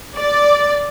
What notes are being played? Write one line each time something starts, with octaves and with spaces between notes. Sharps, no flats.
D5